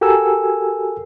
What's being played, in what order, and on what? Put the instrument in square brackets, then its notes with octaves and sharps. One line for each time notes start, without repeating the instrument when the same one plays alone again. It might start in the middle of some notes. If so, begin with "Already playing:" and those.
[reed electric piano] F#4 G4 A4 A#4 G#5 E6